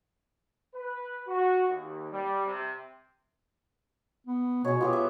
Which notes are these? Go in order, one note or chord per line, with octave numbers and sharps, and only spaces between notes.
B4
F#4
D#2
G3
C3
B3
B2 G#4 C#5
B3 F4 G4 B4
E5